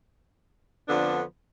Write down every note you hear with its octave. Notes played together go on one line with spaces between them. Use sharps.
F2 D3 F3 B3 D4